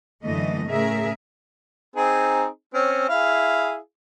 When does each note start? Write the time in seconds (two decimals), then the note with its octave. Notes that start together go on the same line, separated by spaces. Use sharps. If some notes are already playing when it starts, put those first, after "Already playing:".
0.23 F#2 D3 E3 A3 D#5
0.68 A2 C#3 A3 G#4 A#4 E5
1.96 C4 D#4 G#4
2.74 C4 C#4
3.09 E4 G#4 F5